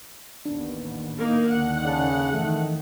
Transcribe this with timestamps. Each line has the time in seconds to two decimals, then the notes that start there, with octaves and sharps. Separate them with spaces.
0.45 A1 D#2 B3 D4
1.18 A#3 D#4
1.48 D#2 D3 D#3 F#5
1.85 C#3 D5 A5
2.33 F2 D#3 E3 A3